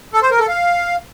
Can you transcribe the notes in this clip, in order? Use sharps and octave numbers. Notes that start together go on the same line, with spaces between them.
A4
C5
A#4
A4
F5